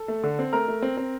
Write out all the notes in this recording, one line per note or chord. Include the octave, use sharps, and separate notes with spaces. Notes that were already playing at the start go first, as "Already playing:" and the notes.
Already playing: A4
A3
D3
C4
A3 A#4 A#5
A3
C4
C4